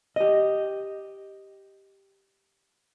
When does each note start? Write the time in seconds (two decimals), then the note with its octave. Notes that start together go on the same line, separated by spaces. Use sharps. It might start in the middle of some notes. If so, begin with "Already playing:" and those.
0.16 G4 D#5